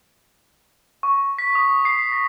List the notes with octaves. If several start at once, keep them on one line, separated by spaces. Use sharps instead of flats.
C#6
B6
D#6
C7
A#6